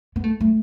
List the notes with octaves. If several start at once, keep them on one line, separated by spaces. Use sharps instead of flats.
B3
A3
A3